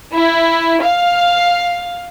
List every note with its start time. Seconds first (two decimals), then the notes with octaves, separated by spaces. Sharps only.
0.14 E4
0.84 F5